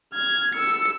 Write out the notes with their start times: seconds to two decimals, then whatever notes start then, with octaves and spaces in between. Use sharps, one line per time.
0.14 F6 G#6
0.55 E6 C#7